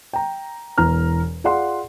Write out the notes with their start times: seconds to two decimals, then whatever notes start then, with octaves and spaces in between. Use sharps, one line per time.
0.13 G5 A#5
0.78 E1 E2 A#5 F6
1.44 F4 G#4 D5 F5 F#5 C6